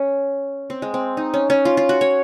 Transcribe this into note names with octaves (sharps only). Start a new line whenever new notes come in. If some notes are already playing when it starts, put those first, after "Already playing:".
Already playing: C#4
C4
G#3
C4
D#4
C#4
C#4
F4
F4
F#4
C#5